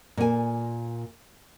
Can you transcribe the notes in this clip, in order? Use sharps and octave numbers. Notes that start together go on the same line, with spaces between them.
A#2 G#5